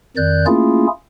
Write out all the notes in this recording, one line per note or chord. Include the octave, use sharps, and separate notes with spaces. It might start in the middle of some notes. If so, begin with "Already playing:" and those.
F2 D#3 D5 F#6 G6
A3 A#3 C#4 E4 F4 G#4